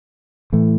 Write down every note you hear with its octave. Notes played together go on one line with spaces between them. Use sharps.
A2 E3 A3